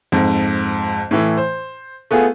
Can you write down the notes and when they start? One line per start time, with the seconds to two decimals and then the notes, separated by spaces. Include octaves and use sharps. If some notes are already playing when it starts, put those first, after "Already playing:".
0.12 F2 G#2
1.11 A2 E3
1.37 C5
2.11 A3 B3 F4 G#4